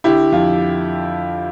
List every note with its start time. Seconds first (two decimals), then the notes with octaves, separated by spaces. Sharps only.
0.04 D3 E4 G4
0.32 F2 F4